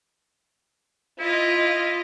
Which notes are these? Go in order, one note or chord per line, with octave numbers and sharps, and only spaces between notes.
E4 F4 D#5